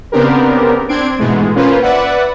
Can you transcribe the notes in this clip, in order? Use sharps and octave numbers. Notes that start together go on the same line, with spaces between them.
C#3 B3 C4 D4 G4 A#4
C4 D4 C6 G#6 D7
G#2 B2 E3 G#3 A3
A#3 C#4 F4 B4 C5
B4 D5 E5 F#5